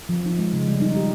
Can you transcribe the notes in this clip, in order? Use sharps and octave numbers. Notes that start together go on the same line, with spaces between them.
F3
D#4
G#3
C#3
G3
D#4
G4